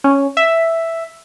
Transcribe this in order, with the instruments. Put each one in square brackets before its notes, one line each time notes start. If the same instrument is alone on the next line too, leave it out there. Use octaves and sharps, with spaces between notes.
[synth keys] C#4
E5